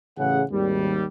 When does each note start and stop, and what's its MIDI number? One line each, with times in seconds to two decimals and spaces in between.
0.18 0.42 33
0.18 0.42 49
0.18 0.42 68
0.18 0.42 78
0.51 1.04 32
0.51 1.04 39
0.51 1.04 55